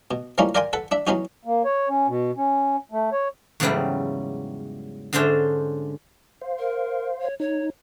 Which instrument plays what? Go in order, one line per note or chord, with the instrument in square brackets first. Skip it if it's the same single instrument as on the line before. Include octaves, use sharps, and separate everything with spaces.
[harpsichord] B2
E3 F3 G3 A#3 C#4 D#4
A#4 D5 F5 G5 G#5 C6
A4 B4 F#5
D4 E5
E3 F#3 B3 C#4 D#4 F#4
[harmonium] A#3
C#5
C#4
B2
C#4
A3
C#5
[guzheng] E2 G#2 C#3 F#3 G3 E4
G#2 D3 C#4 D4 C5 E5
[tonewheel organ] C5 F5
[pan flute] A#4
C#5
[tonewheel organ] D#4 [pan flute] C#5